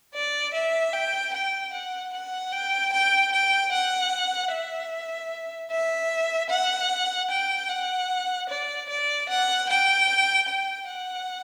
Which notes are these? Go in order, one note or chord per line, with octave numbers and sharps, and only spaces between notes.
D5
E5
G5
G5
F#5
F#5
G5
G5
G5
F#5
E5
E5
F#5
G5
F#5
D5
D5
F#5
G5
G5
F#5